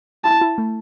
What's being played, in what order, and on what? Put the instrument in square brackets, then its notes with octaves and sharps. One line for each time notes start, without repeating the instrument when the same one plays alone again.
[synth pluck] E4 [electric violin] A5
[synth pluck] E4
A3